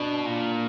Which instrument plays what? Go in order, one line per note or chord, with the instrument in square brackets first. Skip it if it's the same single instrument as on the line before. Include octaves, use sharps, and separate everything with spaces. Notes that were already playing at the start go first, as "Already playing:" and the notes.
Already playing: [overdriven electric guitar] B2 [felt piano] D4
[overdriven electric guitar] A#2